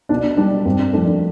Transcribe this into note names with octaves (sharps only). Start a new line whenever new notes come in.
B2 D4
G3 D4
G2 C4
F3 A3 D4